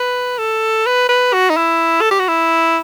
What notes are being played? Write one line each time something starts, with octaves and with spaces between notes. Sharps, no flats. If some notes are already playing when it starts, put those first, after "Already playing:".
Already playing: B4
A4
B4
B4
F#4
D#4
E4
A4
G4
F#4
E4